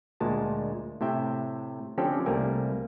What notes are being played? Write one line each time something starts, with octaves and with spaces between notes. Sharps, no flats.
D2 A#2 G#3 A5
A2 C3 E5 G5
D3 F3 C4 C#4 G4 A4
C2 G3 A3 A#3 A#4 G#5